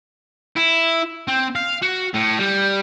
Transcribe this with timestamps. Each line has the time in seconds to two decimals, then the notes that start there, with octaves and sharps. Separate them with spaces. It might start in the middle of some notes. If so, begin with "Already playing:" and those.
0.57 E4
1.28 C4
1.56 F5
1.82 F#4
2.14 A2
2.39 G3